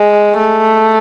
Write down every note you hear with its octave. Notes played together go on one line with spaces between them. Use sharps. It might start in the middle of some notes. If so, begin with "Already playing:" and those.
Already playing: G#3
A3